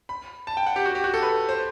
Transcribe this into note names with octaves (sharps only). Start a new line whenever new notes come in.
B5
A5
G5
F#5
G4
F#4
G4
F#4
A4
B4
C5